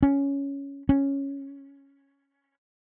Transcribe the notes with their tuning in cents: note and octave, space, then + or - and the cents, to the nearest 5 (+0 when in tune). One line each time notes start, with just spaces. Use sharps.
C#4 +5
C#4 +0